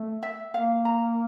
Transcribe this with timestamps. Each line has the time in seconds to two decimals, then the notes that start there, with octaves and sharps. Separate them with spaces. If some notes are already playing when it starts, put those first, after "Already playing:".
Already playing: A3
0.23 E5
0.54 A#3 F5
0.85 A#5